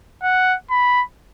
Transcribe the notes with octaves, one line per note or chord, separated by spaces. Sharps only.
F#5
B5